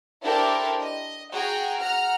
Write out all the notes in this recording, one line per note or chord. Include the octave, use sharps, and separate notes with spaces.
D4 E4 G4 A4 A#4 C5
D#5
F#4 G#4 G5 G#5 A#5
F#5 A#5 F6